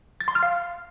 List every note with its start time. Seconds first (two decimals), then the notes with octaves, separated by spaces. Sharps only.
0.21 A6
0.28 C6
0.35 F6
0.43 F5